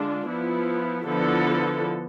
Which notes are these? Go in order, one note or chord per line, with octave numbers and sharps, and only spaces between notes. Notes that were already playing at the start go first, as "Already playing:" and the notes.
Already playing: D3 G#3 D4 F4
F3 B3 E4
D3 F3 B3 E4 A4